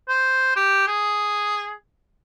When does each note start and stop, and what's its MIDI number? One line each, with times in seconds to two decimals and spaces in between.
0.09 0.52 72
0.56 0.86 67
0.87 1.74 68